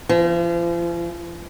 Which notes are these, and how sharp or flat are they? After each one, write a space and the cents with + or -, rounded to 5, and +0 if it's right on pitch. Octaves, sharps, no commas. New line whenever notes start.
F3 -40